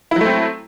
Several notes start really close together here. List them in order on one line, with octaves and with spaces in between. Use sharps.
E4 F#3 A3 C4